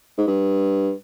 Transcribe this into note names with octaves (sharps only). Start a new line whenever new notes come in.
G#2
G2